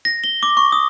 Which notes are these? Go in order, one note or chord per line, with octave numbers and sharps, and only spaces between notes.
A#6
G7
D6
C#6
D#6